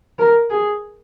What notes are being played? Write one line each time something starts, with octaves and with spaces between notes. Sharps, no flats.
A#4
G#4